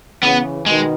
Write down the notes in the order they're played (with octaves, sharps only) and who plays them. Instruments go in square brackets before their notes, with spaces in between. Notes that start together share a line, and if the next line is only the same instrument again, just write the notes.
[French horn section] C#3 E3 [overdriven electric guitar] B3
[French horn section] B2 D#3 [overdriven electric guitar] G#3